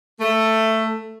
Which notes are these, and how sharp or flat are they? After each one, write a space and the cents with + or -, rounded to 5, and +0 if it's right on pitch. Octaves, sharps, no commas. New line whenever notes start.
A3 +10